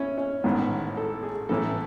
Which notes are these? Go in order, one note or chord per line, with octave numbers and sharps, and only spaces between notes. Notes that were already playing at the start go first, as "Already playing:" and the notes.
Already playing: C#4 E4
C#4
A1 G#2 D#3 B3
A4
G#4
A1 A2 E3 A4